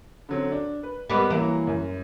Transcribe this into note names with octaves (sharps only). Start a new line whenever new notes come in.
D3 F#3 C4
D4
B4
G3 A#3 B3 B4 D#5 B5
E3 F#3 A#3 A#5
F#2